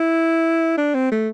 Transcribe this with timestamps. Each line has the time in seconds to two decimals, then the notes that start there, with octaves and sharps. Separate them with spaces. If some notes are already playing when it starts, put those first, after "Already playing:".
Already playing: E4
0.77 D4
0.94 C4
1.11 A3